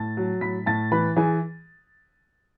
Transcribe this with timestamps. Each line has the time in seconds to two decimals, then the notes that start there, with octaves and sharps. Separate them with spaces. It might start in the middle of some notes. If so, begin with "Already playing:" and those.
Already playing: A2 A5 A6
0.17 F#3
0.41 A2 B5 B6
0.66 A2 A5 A6
0.92 E3 B4 B5
1.16 E3 G#4 G#5